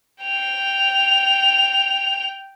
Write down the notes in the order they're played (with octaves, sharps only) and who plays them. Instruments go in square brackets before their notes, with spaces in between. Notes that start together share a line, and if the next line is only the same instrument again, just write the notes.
[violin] G5 F7